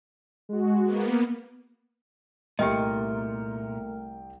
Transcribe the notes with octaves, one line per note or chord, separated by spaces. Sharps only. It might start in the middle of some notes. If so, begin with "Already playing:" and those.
G#3 F#4
A#3 B3
C2 A#2 A3 G4 A#4 D#5 G5 C#7